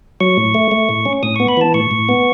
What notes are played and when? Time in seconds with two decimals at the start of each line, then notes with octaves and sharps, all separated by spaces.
0.20 F#3 C#6
0.37 A2
0.54 A3
0.71 A3
0.89 A2
1.05 C#4
1.23 A2 D#6
1.36 B3 C#6
1.48 B5
1.57 E3 A5
1.74 A2 C#6
1.91 A2
2.09 B3